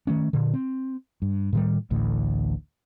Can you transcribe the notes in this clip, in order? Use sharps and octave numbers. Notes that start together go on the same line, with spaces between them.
D#3 A3 C#4
A#2 D3
C4
G2
A2 D#3 G3
A1 D2 A2